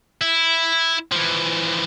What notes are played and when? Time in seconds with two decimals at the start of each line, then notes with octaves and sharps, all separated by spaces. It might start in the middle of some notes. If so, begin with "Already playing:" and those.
0.21 E4
1.11 E3 F3